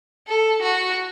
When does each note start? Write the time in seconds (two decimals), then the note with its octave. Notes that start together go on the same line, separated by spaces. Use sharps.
0.28 A4
0.62 F#4